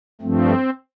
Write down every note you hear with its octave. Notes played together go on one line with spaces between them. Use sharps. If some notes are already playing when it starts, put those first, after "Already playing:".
G2 F3 A3 C4